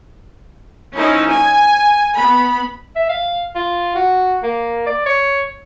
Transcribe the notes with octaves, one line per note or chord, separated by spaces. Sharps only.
F3 C#4 D#4 E4
G#5
B3 B5
E5
F5
F4
F#4
A#3
D5
C#5